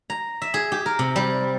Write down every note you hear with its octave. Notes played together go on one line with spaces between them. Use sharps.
A#5
E5
G#4
G4
A#4
C3
G3